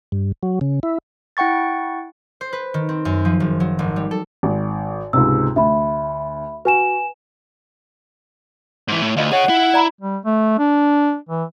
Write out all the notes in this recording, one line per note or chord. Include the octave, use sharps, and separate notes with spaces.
G2
F#3
C#3
E4
E4 F#5 G5 C#6 A6
C5
B4
D#3
C4
F#2
F3
F#1
F#3
G#1
G3
A4
G#1
C#2 G#2 C3 E6
D2 E5 B5
F#4 B4 G#5 E7
G#2 E3
A2
D2 F4 D#5 F5
G#4 C#5 F#5
E4
D5 A#5 B5
G3
A3
D4
E3